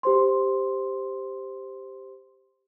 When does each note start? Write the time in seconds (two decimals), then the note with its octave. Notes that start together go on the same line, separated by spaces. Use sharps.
0.03 G4 C5 C6